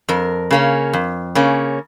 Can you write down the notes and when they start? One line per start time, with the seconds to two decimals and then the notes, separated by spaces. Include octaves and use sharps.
0.09 F2 A#4
0.51 C#3 A#3 C#4
0.93 F2
1.35 C#3 A#3 C#4